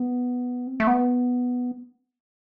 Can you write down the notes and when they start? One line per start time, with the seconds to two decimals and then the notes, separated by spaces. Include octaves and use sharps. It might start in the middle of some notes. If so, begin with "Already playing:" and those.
Already playing: B3
0.67 C4
0.80 A3
0.87 B3